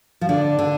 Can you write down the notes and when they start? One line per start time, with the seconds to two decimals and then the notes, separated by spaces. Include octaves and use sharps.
0.21 F3
0.29 D3 D4
0.59 D3